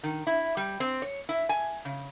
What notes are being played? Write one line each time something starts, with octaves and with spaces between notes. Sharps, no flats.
D#3
E4
G3
C4
C#5
E4
G#5
C#3